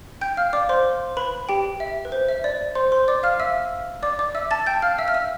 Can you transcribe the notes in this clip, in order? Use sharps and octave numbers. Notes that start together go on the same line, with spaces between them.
G5 G6
F5 F6
D5 D6
C5 C6
B4 B5
G4 G5
E5
B4
C5
E5
D5
C5 C6
C5 C6
D5 D6
F5 F6
E5 E6
D5 D6
D5 D6
E5 E6
A5 A6
G5 G6
F5 F6
E5 E6
F6
E5 E6